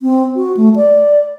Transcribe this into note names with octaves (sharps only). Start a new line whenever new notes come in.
C4
F#4
A3
D5